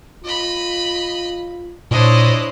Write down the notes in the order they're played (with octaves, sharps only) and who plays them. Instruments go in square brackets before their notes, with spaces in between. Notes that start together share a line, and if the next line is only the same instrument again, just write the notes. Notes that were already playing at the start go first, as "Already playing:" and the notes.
[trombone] F4 [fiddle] D#5 B5
[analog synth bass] A#2 [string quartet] D4 C5 D#5 [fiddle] E4 C#5